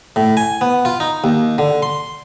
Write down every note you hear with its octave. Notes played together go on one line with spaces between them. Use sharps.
A2
G#5
B3
F4
D#4
D#2
D3
C6